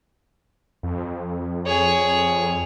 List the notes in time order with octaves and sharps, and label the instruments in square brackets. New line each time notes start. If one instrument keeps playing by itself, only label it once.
[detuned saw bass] F2
[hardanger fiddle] G#4 C#5